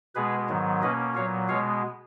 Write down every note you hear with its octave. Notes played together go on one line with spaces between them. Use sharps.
B2 G#3 B3 G#4 B4
G#2 D#3 F#3 B3
B2 A#3 C#4 B4 D#5
A#2 F#3 B3 C#5 F5
B2 G#3 B3 C#5 F5